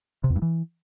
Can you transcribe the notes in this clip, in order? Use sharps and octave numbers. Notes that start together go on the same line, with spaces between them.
C3
E2
G2
E3